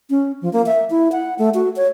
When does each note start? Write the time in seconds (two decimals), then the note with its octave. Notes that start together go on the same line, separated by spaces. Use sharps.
0.10 C#4
0.42 F3
0.53 A#3
0.66 E5
0.90 E4
1.12 F#5
1.39 A3
1.54 F#4
1.76 C#5